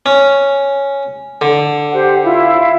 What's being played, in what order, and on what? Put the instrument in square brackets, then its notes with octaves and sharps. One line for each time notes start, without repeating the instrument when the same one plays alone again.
[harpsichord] C#4
D3
[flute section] G4 C5 F#5
E4 F4 F5